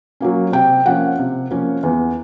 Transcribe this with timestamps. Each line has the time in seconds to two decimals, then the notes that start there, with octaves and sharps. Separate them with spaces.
0.20 F#3 A#3 C#4
0.52 C3 G5
0.86 F3 A#3 C#4 F#5
1.19 C3
1.51 F3 A#3 C#4
1.83 E2